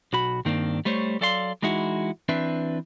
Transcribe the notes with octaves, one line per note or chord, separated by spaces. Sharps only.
B1 F#4 B5
G2 D#3 A#3 C4 D4
G3 A3 C5 C#5
F#3 A4 D5 F5 F#5 C6
E3 G#3 D#4 E4 F#4
E3 C4 D4 B4 E5